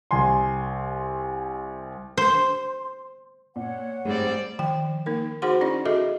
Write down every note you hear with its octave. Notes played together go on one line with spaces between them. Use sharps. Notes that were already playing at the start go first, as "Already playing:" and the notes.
C2 G#5 C6
C5
A#2 C#5 F#5
G#2 G3 A3 C4 D5
D#3 F3 G5
A#3 D#4 A#4
D#4 F#4 G#4 C5 F#5 C6
C#4 D#4 E4 D5
F#4 G#4 A4 D#5 E5